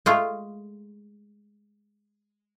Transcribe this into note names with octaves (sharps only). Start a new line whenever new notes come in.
G#3 A3 F4